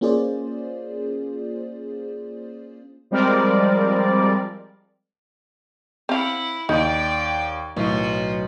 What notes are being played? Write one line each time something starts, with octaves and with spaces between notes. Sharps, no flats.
A#3 C#4 F4 G#4 C5 D5
F3 G3 G#3 C4 A#4 D5
C4 E4 F5 F#5
D#2 D#4 D5 G5
B1 A2 F4 F#4